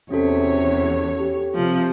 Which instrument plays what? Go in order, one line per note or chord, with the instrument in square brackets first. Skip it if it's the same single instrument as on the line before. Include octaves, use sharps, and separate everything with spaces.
[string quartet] E2 C#5 [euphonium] C3 [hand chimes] C#4 F#4 A4
[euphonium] G4
[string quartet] C3 F3